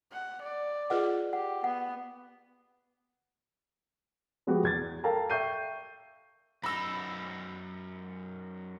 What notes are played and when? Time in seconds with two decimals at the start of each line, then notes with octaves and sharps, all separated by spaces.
0.12 F#5
0.42 D5
0.90 F4 G#4 B4 D#5 F#5
1.33 G4 F#5
1.64 B3 F#5
4.47 F3 G#3 B3 F#4 G4
4.63 E2 G#6 A6
5.04 A4 A#4 F5 G5 A5 A#5
5.30 E5 G5 C#6 G6 C7 D#7
6.63 F#2 D#4 B5 E6